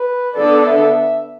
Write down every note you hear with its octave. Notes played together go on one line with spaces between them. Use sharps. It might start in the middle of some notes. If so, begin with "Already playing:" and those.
Already playing: B4
D3 B3 D4 A4 D5
E5